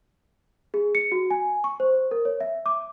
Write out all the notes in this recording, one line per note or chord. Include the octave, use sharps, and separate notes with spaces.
G#4
C#7
F#4
G#5
C#6
C5
A#4
C#5
E5
D6